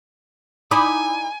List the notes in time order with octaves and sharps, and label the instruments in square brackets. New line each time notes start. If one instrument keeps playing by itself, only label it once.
[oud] D#4 E4 [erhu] G#5 [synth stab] B5 D6 D#6